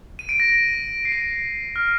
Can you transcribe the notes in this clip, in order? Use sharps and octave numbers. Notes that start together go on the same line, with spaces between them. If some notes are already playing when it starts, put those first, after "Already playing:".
D#7
D7
A#6
A#6
C7
D7
F6